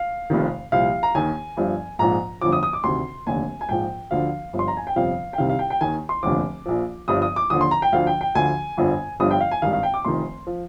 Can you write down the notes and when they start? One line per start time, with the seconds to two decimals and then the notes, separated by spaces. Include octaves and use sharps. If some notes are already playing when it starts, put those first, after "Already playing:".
Already playing: F5
0.30 F1 F2 C3 D#3
0.72 C2 A#2 F3 F5
1.03 A#5
1.15 D#2 D#3 G#5
1.57 G1 G2 F3
1.99 A#1 G#2 F3 A#5
2.41 G1 F2 D3 F3 D6
2.52 D#6
2.63 D#6
2.73 D6
2.84 D2 C3 D#3 C6
3.26 F1 D#2 D3 G#5
3.61 G#5
3.69 A#1 G#2 F3 G5
4.11 D2 D3 F3 F5
4.53 G1 G2 F3
4.59 C6
4.68 A#5
4.77 G#5
4.87 G5
4.96 G1 F2 C3 F3 F5
5.33 G5
5.38 C2 C3 D#3 F5
5.49 F5
5.59 G5
5.70 G5
5.81 D#2 D#3 G#5
6.09 C6
6.23 F1 D#2 D3 F3 D6
6.66 A#1 A#2 F3
7.08 G1 G2 F3 D#6
7.22 D#6
7.36 D6
7.50 D#2 D3 F3 D#6
7.61 C6
7.71 A#5
7.82 G5
7.92 D2 D3 F3 F5
8.07 G5
8.21 G5
8.35 D2 D3 F3 G#5
8.77 G1 F2 D3 F3
9.20 G1 G2 D3 F3 D#6
9.31 G5
9.40 F5
9.51 G#5
9.62 G#1 G2 D#3 F5
9.73 F5
9.83 G5
9.94 D6
10.05 F1 F2 D#3 C6
10.47 F3